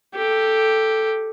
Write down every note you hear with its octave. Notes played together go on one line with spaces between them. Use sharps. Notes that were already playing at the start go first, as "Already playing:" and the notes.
G4 A4